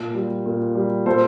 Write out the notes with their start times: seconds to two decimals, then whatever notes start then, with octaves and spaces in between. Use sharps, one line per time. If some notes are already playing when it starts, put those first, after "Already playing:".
Already playing: A#2
0.14 G3
0.46 A#2
0.75 G3
1.06 A#2 A4 C5